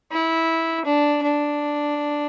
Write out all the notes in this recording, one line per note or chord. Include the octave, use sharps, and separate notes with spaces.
E4
D4
D4